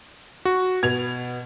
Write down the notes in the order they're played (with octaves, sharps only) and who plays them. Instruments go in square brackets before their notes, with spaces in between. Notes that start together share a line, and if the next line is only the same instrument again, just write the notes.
[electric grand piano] F#4
[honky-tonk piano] B2 F7 [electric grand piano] G#6